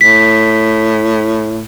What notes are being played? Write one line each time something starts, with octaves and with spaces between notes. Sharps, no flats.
A2 B6